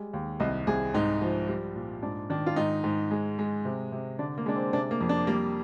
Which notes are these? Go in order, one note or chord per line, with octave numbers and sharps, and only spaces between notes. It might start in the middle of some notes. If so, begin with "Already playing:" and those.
Already playing: G3 G#3
D#2
C2 D#5
C2 G#4
G#2 D#4
F3
G3
A#2
G#2 D4
D#3 D4
F4
G#2 D#4
G#2
G#3
G#3
C3
C3
D3 D4
A#3
G#3 D4
C4
C3 D4
A#3
F2
D4
G3 A#3